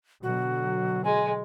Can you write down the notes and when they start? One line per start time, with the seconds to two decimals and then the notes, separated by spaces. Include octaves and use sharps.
0.23 B2 D3 F#3 F#4
1.05 G#3 G#5